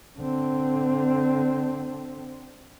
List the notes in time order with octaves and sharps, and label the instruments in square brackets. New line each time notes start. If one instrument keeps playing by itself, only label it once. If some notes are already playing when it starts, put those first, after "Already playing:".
[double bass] D3 C4